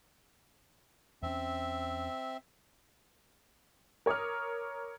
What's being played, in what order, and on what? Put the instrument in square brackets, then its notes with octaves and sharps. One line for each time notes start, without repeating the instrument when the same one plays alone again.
[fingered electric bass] E2 C#4 [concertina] C4 E5
[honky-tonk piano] A#4 C#5 D6 D#6 F6